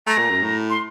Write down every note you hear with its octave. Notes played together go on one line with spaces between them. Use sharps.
A3 A#5
A#2
F#2
A2
C6